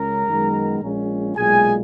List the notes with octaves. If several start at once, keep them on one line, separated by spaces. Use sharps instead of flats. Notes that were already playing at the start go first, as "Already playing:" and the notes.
Already playing: C#2 C#3 G#3 C#4 A#4 A#5
F#2 D#3 G#3 B3
A#1 A#2 G#3 C#4
B1 A#2 G#3 G#4 G#5